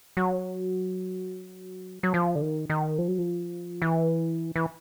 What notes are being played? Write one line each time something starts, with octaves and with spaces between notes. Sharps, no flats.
F#3
F#3
F3
D3
D#3
D#3
F3
F#3
F3
E3
E3